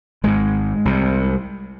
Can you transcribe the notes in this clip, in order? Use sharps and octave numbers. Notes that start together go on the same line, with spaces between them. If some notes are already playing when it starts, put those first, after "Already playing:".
G#1 G#2 G#3
C2 C3